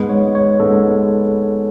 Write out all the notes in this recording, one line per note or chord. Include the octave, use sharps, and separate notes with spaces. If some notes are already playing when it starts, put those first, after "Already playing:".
Already playing: G#2 G#3 B3
C#5
C#5
G#2 G#3 B3 A4